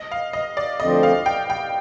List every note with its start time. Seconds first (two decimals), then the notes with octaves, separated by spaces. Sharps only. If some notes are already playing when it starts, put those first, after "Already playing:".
Already playing: D#5
0.12 F5
0.33 D#5
0.57 D5
0.80 D2 D3 F3 C4 D#5
1.03 F5
1.26 G5
1.50 G5